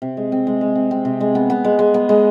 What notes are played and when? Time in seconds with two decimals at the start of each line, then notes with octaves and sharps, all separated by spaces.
0.02 C3
0.17 G#3
0.32 C4
0.47 G#3
0.61 G#3
0.75 C4
0.91 C4
1.05 C3
1.21 G#3
1.35 B3
1.50 B3
1.64 G#3
1.79 G#3
1.94 B3
2.09 G#3